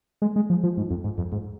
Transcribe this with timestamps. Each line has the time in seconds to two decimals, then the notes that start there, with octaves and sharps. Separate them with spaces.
0.22 G#3
0.36 G#3
0.50 F3
0.63 F3
0.77 G#2
0.90 F2
1.04 G#2
1.18 F2
1.32 G#2